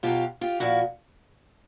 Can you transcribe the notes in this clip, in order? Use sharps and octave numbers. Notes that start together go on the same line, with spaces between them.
B2 F#3 F4 G4
F4 G4
A#2 F3 E4 F#4